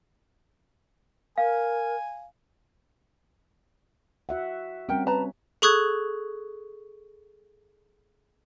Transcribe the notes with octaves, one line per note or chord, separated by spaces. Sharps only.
A#4 F5 G#5
F#4 E5 F#5
G3 C4 C#4 A#4 F#5 G5
B4 C#5 A5 A#5
G#4 A4 C#6 D#6 F#6 G#6